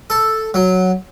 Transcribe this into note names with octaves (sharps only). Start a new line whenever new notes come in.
A4
F#3